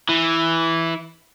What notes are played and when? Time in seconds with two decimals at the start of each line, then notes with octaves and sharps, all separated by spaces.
0.09 E3